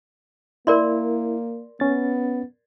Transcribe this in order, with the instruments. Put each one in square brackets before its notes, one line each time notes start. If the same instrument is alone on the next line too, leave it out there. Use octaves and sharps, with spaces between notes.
[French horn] A#3 [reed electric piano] E4 [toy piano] A#4 D5 C6
[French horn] B3 [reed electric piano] C#4 A6